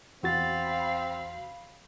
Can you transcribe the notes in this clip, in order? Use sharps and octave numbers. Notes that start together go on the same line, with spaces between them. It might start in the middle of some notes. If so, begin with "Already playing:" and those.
E2 C4 F#4 F5 B5 A6